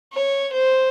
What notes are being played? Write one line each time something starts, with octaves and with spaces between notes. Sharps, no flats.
C#5
C5